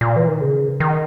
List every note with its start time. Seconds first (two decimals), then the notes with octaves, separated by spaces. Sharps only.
0.01 A#2
0.16 E3
0.28 D#3
0.41 C#3
0.80 D#3